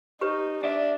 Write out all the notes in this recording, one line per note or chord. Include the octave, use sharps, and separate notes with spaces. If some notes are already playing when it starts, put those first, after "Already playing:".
D#4 G4 B4 C#5
D4 D5 E5